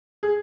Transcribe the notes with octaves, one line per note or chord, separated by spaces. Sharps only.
G#4